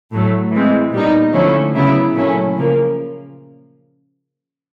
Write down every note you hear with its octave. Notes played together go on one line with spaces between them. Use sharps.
A2 F#3 A3
E3 G#3 C4
A#2 G3 B3 D#4
D3 F3 A3 C#4 E4
C#3 F#3 B3 E4
A#2 F#3 A3 C#4 E4
C#3 F3 A#3